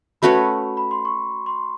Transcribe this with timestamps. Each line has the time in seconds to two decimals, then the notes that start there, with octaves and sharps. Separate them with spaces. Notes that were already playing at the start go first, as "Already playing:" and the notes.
0.22 A3 C#4 F#4 B4 B5
0.77 B5
0.91 C6
1.05 C#6
1.46 C6